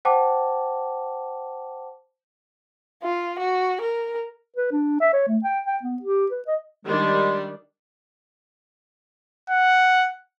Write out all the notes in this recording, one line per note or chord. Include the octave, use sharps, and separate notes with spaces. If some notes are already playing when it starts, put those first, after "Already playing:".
C5 F#5 G5 A5 D6
F4
F#4
A#4
B4
D4
E5
C#5
A3
G5
G5
B3
G4
B4
D#5
D#3 G3 G#3 D4
F#5